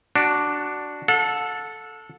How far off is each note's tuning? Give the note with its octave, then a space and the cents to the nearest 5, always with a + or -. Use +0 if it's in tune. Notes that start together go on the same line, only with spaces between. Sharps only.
D4 +0 F#4 +10
A4 +0 F#5 -40